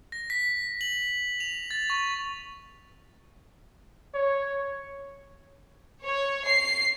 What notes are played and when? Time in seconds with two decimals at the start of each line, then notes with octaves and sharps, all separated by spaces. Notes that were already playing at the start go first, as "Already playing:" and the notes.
0.12 A#6
0.30 B6
0.81 F#7
1.40 F7
1.71 A6
1.90 C#6
4.15 C#5
6.05 C#5
6.47 C7